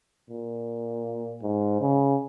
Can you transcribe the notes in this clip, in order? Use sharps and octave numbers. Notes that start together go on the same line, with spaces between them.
A#2
G#2
C#3